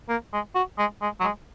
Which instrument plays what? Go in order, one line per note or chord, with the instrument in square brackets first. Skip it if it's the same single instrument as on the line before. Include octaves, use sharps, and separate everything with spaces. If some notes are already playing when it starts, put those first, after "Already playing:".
[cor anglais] A#3
G#3
F#4
G#3
G#3
F#3
G#3